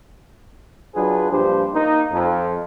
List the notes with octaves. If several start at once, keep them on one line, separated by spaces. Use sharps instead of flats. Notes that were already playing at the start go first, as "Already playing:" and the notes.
F#3 D4 F4 G#4 B4
A#1 G2 F3 G4 C5
A#3 D#4
F2